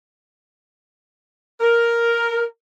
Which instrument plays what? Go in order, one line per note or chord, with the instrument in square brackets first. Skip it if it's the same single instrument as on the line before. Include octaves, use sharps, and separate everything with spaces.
[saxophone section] A#4